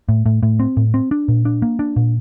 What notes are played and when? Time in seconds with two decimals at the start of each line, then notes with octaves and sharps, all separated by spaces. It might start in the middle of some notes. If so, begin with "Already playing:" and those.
0.09 A2
0.26 A2
0.43 A2
0.60 C4
0.77 A2
0.94 C4
1.11 D4
1.28 A#2
1.45 D4
1.62 A#3
1.79 D4
1.96 A#2